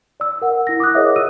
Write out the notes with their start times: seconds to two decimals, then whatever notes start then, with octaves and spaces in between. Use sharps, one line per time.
0.20 D5 E6
0.42 A#4 F#5
0.67 E4 A#6
0.80 D6 D#6 F#6
0.94 G#4 A#4 C#5 D#5 E5 F#5
1.16 F4 D#6 E6 D#7